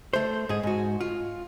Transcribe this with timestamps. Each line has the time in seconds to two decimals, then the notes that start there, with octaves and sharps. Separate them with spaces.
0.13 A3 C5
0.49 G#2 G#4
0.63 G#2 F#4
1.01 F4